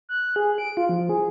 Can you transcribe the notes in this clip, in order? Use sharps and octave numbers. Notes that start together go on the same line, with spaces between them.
F#6
G#4
D7
F4
F3
G#4